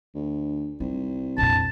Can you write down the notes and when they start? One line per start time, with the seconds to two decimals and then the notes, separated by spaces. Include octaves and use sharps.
0.14 D2
0.80 C2 D#4
1.38 A#1 F2 A5